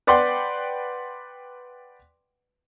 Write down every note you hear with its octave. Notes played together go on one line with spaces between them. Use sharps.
B4 D5 F#5 G5 C6